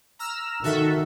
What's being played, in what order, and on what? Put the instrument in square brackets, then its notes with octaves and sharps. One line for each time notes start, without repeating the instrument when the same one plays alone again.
[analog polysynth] A#5 E6 F6
[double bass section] D#3 [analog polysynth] F#4 A4 E5